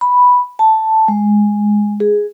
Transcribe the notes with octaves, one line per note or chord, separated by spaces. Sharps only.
B5
A5
G#3
G#4